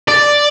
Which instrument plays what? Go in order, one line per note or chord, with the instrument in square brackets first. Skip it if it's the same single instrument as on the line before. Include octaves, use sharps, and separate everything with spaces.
[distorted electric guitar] D5